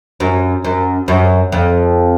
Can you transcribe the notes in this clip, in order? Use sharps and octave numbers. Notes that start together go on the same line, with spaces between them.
F#2
F#2
F#2
F2